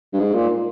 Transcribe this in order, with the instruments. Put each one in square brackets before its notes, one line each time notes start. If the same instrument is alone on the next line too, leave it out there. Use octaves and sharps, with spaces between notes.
[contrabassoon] G2
G#2
A#2